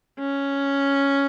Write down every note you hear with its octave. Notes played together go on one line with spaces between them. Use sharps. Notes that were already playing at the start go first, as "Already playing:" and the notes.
C#4